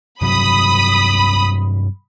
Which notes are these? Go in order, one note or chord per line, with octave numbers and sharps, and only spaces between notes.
G2 C3 F#3 B5 D#6